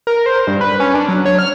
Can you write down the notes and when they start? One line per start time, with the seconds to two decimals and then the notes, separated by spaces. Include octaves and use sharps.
0.07 A#4
0.26 C5
0.47 G2
0.61 B4
0.80 C#4
0.94 D4
1.09 F#3
1.25 C#5
1.39 F6